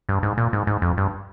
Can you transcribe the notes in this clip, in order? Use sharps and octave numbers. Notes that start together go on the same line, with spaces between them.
G2
G#2
A#2
G#2
G#2
F2
G2